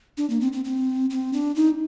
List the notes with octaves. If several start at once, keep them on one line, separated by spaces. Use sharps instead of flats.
D4
A#3
C4
C4
C4
C4
D4
D#4